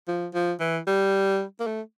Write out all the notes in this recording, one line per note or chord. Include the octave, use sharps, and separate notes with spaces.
F3
F3
E3
G3
A#3
A3